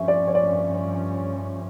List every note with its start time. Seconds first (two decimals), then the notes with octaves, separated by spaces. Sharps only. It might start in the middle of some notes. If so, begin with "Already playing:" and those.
Already playing: G2 F3 C#4 E5
0.08 D5
0.27 C#5
0.35 D5